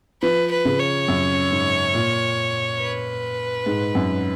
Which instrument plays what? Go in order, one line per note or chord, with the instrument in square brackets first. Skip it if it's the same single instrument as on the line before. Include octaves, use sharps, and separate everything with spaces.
[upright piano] F3 [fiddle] B4
[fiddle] B4
[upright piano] C#3
[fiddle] C#5
[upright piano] F#2
G#2
A#2
[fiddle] B4
[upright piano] G#2
F#2